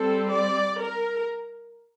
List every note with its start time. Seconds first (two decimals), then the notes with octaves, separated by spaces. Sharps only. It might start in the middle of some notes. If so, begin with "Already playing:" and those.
Already playing: G3 C4 A4
0.32 D5
0.79 A#4